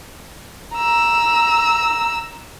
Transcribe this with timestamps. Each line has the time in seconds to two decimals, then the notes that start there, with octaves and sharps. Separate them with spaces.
0.76 A#5 E6